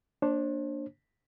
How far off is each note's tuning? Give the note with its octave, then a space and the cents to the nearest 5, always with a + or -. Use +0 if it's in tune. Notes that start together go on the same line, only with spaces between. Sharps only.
A#3 +0 D4 +0 C5 +40